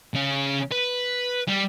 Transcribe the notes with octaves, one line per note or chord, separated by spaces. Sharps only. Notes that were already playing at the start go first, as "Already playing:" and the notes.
C#3 C#4
B4
G3